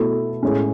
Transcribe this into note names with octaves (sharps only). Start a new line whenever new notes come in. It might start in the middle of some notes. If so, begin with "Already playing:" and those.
Already playing: B2 A3 E4 A4
A2 G#3 C#4